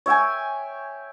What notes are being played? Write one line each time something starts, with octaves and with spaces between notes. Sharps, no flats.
C#5 E5 G5 G#5